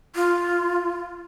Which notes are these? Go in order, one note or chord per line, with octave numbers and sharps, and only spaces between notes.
F4